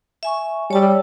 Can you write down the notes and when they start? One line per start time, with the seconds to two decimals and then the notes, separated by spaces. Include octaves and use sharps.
0.23 E5 G#5 C#6
0.71 G3 C#5 A5 E6